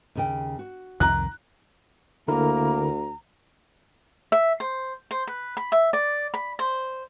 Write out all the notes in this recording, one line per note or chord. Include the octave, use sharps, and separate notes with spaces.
D#2 C#3 G5
F#4
C2 F2 D#3 A#5 F#6
D2 D3 A#3 E4 A#4 A#5
E5
C5
C5
B4
B5
E5
D5
B5
C5